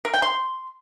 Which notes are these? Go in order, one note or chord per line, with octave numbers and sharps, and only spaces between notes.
A#4
G5
C6